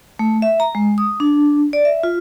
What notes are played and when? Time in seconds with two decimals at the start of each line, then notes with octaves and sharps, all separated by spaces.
0.19 A3
0.42 E5
0.60 A#5
0.75 G#3
0.98 D#6
1.20 D4
1.73 D5
1.85 E5
2.03 F4